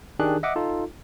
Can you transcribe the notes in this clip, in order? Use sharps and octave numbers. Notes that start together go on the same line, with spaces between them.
D#3 D4 G4 G#4 F#6
D#5 E5 F#5 D6 D#6
D#4 F4 A4